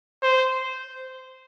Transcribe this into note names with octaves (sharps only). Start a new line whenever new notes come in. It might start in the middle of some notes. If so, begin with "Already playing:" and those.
C5